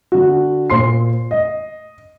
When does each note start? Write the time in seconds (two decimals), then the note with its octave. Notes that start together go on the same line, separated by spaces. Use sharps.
0.12 D3 F#4
0.70 A#2 C5 C6 C7
1.31 D#5